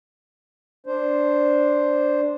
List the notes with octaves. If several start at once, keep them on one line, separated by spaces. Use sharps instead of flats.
D4 C5